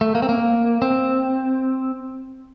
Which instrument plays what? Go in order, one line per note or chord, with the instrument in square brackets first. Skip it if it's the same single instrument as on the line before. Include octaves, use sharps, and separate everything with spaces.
[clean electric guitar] A3
A#3
C4
A#3
C4